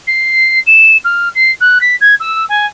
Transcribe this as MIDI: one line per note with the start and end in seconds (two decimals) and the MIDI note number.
0.07 0.60 96
0.67 0.97 100
1.05 1.29 89
1.35 1.52 96
1.61 1.81 90
1.81 1.96 95
2.01 2.15 92
2.20 2.44 88
2.49 2.66 80